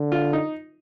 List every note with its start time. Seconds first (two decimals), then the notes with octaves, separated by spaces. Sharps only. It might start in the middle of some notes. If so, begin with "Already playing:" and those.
Already playing: D3
0.12 F4
0.33 D#4